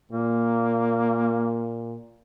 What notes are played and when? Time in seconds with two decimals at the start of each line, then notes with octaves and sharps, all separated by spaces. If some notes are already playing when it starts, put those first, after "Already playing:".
0.12 A#2 A#3